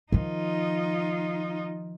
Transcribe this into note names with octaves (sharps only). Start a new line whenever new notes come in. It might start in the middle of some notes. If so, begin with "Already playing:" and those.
D#3 F3 D#4 F4